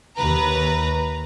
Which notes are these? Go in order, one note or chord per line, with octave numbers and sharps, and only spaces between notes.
D#2 B4 A#5